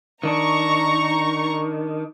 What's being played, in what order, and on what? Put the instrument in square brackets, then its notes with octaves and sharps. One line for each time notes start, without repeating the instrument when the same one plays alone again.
[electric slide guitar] D#3 D4 [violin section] A#5 C#6